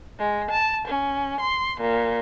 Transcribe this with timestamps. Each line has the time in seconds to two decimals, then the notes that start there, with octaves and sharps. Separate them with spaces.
0.19 G#3
0.50 A5
0.87 C#4
1.39 C6
1.80 A#2